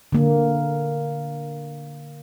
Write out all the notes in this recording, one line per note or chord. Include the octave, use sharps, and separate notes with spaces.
D3 A#3